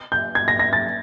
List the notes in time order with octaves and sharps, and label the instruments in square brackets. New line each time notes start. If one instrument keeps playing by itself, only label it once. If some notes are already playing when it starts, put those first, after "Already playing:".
[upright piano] G6
G#6
A#6
A#6
A6